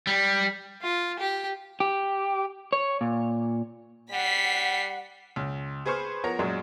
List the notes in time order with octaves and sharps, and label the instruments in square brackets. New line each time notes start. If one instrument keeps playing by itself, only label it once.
[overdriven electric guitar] G3
[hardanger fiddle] F4
G4
[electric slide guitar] G4
C#5
A#2
[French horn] G3 [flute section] F#5 [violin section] B6 C7
[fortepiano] C#2
G#4 B4 C5 C#6 F6
F3 B3 A#4 C#5 A#5
F#2 A#2 F#3 G#3